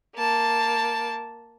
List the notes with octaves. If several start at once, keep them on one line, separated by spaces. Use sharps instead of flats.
A#3 A5